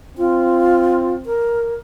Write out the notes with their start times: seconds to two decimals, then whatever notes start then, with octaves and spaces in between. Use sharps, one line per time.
0.17 C4 F4
1.25 A#4